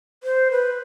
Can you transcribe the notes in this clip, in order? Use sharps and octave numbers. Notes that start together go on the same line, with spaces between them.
C5
B4